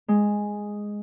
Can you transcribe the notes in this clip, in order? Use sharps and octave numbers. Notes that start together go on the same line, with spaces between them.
G#3